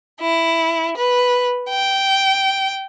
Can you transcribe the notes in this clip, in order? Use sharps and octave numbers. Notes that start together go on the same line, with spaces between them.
E4
B4
G5